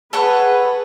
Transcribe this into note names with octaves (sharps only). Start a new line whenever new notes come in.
G#4 A4 B4 C#5 F#5